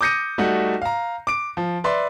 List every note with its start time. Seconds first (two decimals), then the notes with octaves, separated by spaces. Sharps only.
0.01 D6 D#6 G6 A#6 C#7 D#7
0.38 G3 A3 D#4 F#4
0.82 F5 A#5
1.27 D6 D7
1.57 F3
1.84 B4 D5 E5 C6